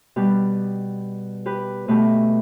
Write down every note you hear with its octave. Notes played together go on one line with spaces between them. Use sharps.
B2 G3 B3 G4 B4
G4 B4
B2 A3 G4 B4